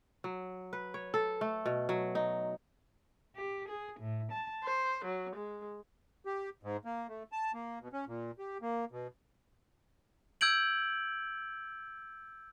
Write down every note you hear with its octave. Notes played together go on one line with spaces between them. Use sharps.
F#3
B4
C#5
A4
A3
B2
F#3
D#4
G4
G#4
A2
A5
C5
F#3
G#3
G4
G#2
A#3
A3
A5
A#3
B2
C#4
A#2
G4
A#3
B2
E6 G6 G#6 D7 F#7